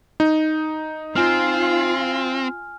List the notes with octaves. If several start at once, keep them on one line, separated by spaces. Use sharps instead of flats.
D#4
C4 F4 G#5 F6